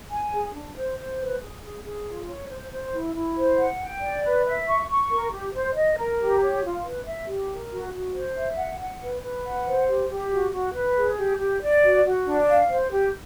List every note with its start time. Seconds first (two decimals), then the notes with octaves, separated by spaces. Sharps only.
0.11 G#5
0.33 G#4
0.54 D4
0.76 C5
0.98 C5
1.19 B4
1.41 G#4
1.63 G#4
1.84 G#4
2.07 F4
2.28 C#5
2.50 C5
2.71 C5
2.93 E4
3.14 E4
3.37 C5
3.58 F#5
3.80 G5
4.01 D5
4.23 B4
4.45 E5
4.67 C#6
4.88 C#6
5.10 A#4
5.31 G4
5.54 C5
5.74 D#5
5.97 A#4
6.19 G4
6.40 C#5
6.62 F4
6.83 B4
7.05 E5
7.26 G4
7.48 A#4
7.70 F#4
7.92 F#4
8.13 C5
8.36 E5
8.57 F#5
8.79 F#5
9.00 B4
9.21 B4
9.44 F#5
9.65 C5
9.87 G4
10.09 G4
10.31 F#4
10.52 F#4
10.73 B4
10.96 G#4
11.17 G4
11.39 G4
11.61 D5
11.82 F#4
12.04 F#4
12.26 D4
12.48 F5
12.69 C5
12.91 G4